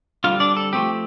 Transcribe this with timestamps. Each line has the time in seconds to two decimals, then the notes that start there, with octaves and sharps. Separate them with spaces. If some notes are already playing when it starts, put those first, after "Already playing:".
0.24 D3 G3 C4 F4 F5
0.40 D4 D5
0.57 A4
0.73 F3 A3 C4 G4